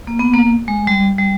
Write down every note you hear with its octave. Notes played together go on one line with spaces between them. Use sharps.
A#3
B3
A#3
G#3
G3
G3